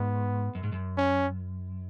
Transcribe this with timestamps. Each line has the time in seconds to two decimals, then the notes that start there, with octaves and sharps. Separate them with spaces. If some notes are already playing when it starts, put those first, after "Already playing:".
Already playing: G#2 B3
0.55 F#2
0.63 G#2
0.72 F#2
0.97 C#4